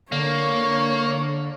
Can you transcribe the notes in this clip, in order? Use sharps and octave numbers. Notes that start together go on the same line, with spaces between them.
D3 A#3 C#5